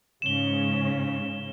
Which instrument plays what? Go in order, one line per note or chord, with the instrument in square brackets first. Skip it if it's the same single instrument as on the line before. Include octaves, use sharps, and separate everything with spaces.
[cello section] G#2 C#3 C#4 [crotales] E7 G7